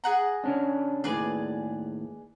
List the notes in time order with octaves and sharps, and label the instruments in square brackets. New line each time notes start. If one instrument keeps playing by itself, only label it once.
[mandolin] G#4 F#5 A#5
[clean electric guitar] C#3 C#4 D4
[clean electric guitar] D#2 A2 [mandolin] G#4 B4 D5